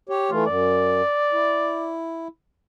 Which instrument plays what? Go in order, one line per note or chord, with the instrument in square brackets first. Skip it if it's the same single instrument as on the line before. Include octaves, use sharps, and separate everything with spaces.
[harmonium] G4 C#5
[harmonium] E3 A3 [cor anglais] F4
[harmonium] F#2 [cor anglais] D5
[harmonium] E4